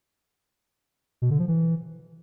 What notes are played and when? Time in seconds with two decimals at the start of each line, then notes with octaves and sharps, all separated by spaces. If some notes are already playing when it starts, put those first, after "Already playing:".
1.22 B2
1.30 D3
1.39 F3
1.48 E3